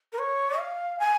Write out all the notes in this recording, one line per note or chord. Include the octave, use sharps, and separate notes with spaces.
A#4
C#5
F5
G#5